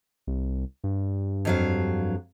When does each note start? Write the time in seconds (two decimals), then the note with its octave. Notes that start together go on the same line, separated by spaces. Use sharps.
0.27 C2
0.84 G2
1.45 F2 F#3 F5